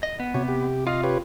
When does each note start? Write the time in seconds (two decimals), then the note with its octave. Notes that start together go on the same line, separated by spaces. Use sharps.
0.03 D#5
0.20 B3
0.34 C3 F#4 C#5
0.48 G4
0.87 F4 D#5 F5
1.03 G4 B4 C#5